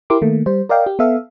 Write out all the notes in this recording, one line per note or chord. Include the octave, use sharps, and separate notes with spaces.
E4 G4 A#4 C6 D6
D#3 A3 A#3
G3 C5
A#4 D5 D#5 F5 G5
G4
B3 A4 E5 F5